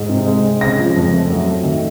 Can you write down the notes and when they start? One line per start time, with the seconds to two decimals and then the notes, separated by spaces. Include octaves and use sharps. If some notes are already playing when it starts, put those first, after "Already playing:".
Already playing: G#2
0.09 C3
0.26 G#3
0.44 G#3
0.61 C#3 A#6
0.78 F3
0.96 F2
1.13 A3
1.30 F#3
1.47 A3
1.64 D#3